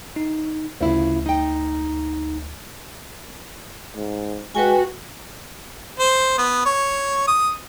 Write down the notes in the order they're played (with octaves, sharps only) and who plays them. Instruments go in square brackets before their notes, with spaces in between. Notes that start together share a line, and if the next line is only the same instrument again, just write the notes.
[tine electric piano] D#4
[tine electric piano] D2 [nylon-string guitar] C#3 E4 F4
[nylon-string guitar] D#4 G5
[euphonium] G#2
[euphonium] G#3 [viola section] F#4 [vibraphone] B4 G5 G#5
[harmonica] C5
B3
C#5
D#6